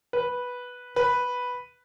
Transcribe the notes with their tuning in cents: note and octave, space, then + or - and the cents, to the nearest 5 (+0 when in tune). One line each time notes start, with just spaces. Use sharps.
B4 -5
B4 +0